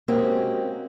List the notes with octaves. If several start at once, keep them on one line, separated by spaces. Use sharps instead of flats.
G#3 A#3 C4 C#4 F#4 G4